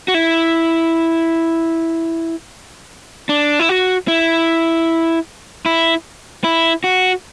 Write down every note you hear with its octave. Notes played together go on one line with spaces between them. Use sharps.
F#4
E4
D4
E4
F#4
E4
E4
E4
F#4